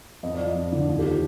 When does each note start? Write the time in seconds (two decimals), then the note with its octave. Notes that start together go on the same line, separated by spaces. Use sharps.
0.23 F2 D#5
0.34 D5
0.40 F3 D#5
0.55 F2
0.72 D3 D5
0.88 D#2
0.99 G4
1.05 F3 F4